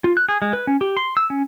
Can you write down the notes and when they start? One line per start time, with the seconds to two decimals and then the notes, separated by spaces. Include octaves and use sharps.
0.04 F4
0.17 F#6
0.29 G#4
0.42 G#3
0.53 B4
0.67 C#4
0.81 G4
0.97 C6
1.17 E6
1.30 C#4